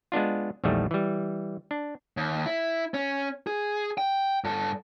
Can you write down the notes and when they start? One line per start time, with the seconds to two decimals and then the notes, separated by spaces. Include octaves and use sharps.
0.12 G#3 B3 D4 F4
0.64 A#1 E2 D#3 G3 A3
0.91 E3 G3
1.71 D4
2.17 D#2
2.46 E4
2.94 C#4
3.47 G#4
3.98 G5
4.44 G2 A4